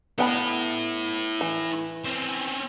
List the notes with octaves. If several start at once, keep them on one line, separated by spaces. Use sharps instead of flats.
B3 E4 A4 G5 B5
E3
C4 C#4